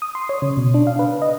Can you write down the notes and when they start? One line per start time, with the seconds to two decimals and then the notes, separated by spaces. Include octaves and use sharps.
0.02 D#6
0.15 C6
0.29 C#5
0.42 C#3
0.57 B2
0.74 D4
0.87 F5
0.99 B4
1.22 D#5